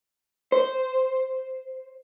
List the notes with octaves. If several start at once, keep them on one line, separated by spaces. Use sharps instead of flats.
C5